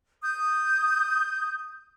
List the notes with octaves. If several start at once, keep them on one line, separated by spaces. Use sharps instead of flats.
D#6 G6